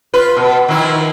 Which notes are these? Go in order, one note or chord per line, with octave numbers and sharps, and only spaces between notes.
F4 B4
B2
D#3 F3 E4